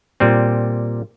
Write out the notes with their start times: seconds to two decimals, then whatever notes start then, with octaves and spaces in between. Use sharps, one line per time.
0.20 A#2 G3 C4